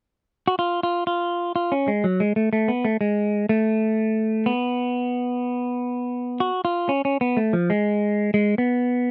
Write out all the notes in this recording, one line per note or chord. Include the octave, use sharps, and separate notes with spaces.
F#4
F4
F4
F4
F4
C#4
G#3
F#3
G#3
A3
A3
B3
A3
G#3
A3
B3
F#4
F4
C#4
C#4
B3
A3
F3
G#3
G#3
B3